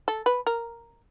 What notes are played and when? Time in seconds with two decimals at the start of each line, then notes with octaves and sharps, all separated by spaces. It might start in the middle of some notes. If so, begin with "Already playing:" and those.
0.08 A4
0.26 B4
0.47 A#4